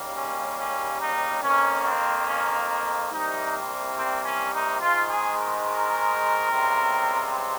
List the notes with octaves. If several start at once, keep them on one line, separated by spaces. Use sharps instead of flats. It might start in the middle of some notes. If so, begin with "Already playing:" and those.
Already playing: D#2 C#3 G3 A#3
C#4
C#4
D#4
F2 D#3 A#3 C#4
C4
C#4
C2 C3 G3 A#3 D#4
C4
C#4
D#4
G#2 D#3 G#3 F4
G#4
A#4
A#4
C#2 C3 G3 C4